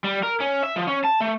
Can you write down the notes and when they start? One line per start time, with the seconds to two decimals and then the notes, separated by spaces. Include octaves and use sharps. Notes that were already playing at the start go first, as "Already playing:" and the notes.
0.04 G3
0.23 A#4
0.40 C#4
0.63 E5
0.76 F3
0.87 C#4
1.04 A5
1.21 A3